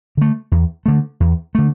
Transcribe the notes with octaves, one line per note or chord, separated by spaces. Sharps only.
D3 A3
E2
D3 A3
E2
D3 A3